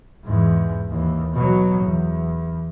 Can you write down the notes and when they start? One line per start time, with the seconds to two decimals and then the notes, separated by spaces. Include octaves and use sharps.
0.25 E2 G#2
0.90 D#2 E3
1.34 B2 F#3
1.83 E2